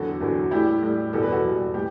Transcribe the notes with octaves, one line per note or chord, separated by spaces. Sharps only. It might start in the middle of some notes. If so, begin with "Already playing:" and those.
Already playing: E2 D3 F#3 F#4 A4
E2 D3 F#3
A2 G3 E4 G4
A2 G3
E2 B2 G3 A4
B4
F#4 A4
E2 B2 G3
A2 G4